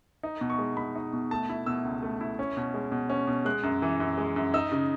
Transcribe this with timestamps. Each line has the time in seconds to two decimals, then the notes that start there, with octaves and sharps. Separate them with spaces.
0.23 D#4
0.41 B2
0.50 C#6
0.59 G#3
0.77 B2 B5
0.95 D#4
1.13 B2
1.31 A3 A5
1.49 E4
1.66 B2 E6
1.85 C#2
2.03 A3
2.21 E4
2.39 C#4
2.57 B2
2.74 G#3
2.92 B2
3.10 C#4
3.27 B2
3.45 G#3 F#6
3.63 F#2
3.82 E3
4.00 F#2
4.18 G#3
4.36 F#2
4.54 D#4 E6
4.72 C#3